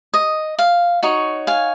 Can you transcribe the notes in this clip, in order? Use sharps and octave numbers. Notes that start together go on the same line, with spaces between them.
D#5
F5
D#4 F#4 C#5
F5 G#5